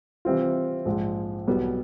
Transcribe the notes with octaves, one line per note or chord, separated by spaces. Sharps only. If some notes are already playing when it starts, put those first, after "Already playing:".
C3 E3 G3 C4 F4
A#1 G#2 F3 G#3
B1 B2 G3 B3